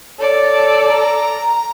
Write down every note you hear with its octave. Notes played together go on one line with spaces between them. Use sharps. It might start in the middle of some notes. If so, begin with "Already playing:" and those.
A4 C#5 D5
A#5